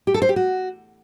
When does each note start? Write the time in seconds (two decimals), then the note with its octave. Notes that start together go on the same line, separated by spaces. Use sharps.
0.07 G4
0.14 A4
0.22 C5
0.29 G4
0.36 F#4